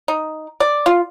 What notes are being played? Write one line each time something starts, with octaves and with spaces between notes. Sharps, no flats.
D#4
D5
F4